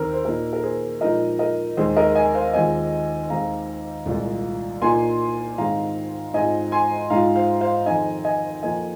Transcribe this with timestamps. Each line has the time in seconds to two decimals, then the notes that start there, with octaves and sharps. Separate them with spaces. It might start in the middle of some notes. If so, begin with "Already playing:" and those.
Already playing: D#2 D#3 C4 A#4
0.13 C5
0.25 A#2 A#3 D#4 A#4
0.53 A#4
0.63 G#4 C5
1.01 A#2 F3 G#3 D#4 A#4 D#5
1.39 A#4 D#5
1.77 D#2 D#3 G#3 G#4 C5
1.96 A#4 D#5
2.15 D#5 G#5
2.34 C5 F5
2.53 D#2 D#3 G#3 C4 F4 D#5 G#5
3.30 D#2 D#3 G#3 C4 F5 A#5
4.06 C2 A#2 G#3 F4
4.82 A#2 A#3 D#4 G#5 C6
5.58 G#2 D#3 G#3 C4 F5 A#5
6.34 G#2 G#3 C4 F4 D#5 G#5
6.72 G#5 C6
7.10 G#2 G#3 F4 F5 A#5
7.35 C5 F5
7.61 C5 F5
7.86 F2 D#3 C4 D#4 D#5 G#5
8.24 D#5 G#5
8.62 F2 F3 A#3 F4 D#5 G#5